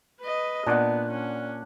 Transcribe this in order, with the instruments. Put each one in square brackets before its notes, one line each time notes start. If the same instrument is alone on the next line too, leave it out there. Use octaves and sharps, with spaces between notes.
[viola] B4 D#5
[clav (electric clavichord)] A#2 [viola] B3 [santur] D4 F#5
[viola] C#4